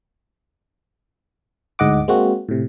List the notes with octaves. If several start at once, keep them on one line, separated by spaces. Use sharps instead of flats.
D2 G#2 D#5 F#5 D6
G#3 A#3 C4 F#4
A2 C3